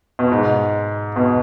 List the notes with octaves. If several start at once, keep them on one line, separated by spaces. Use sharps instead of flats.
B2
G#2
B2